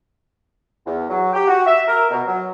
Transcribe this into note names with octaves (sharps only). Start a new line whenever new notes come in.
E2
F#3
G4
F#4
E5
A#4
B2
F#3